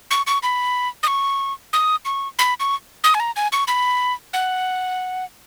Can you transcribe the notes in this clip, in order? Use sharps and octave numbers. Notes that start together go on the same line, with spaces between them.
C#6
C#6
B5
D#6
C#6
D#6
C#6
B5
C#6
D#6
G#5
A#5
G#5
C#6
B5
F#5